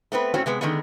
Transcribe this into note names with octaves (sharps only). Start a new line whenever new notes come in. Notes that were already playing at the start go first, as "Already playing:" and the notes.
A3 B3 C4 B4
A2 A3 C4 C#4 F#4
C3 G#3 B3
D3 D#3 G#3 A3 B3